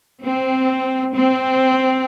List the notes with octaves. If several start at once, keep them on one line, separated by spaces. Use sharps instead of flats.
C4
C4